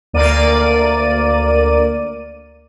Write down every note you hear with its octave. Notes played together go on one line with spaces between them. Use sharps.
D2 A#3 A#4 D5 D#7